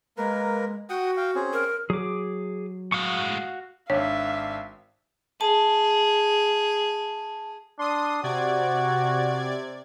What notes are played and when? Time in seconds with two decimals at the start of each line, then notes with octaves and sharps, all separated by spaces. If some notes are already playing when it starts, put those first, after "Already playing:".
0.18 G#3 A#3 A#4 B4
0.90 F#4 F#5 G5 D#6
1.17 F5 G5
1.35 C4 C#4 G#4
1.53 A#4
1.90 F#3 G#4 D6
2.92 A2 G#3 F#4 F5 C#6
3.90 G#1 D4 C#5 E5 F5
5.41 G#4 A5
7.79 D4 C6 D#6
8.23 C3 F#4 D5 G#6